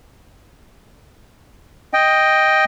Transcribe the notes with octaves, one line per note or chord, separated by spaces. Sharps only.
D#5 G5